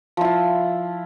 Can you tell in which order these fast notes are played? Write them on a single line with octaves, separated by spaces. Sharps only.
F3 E4 F4